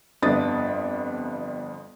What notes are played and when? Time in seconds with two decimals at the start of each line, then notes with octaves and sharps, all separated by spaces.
0.22 G1 F2 B3 D4 D#6 A6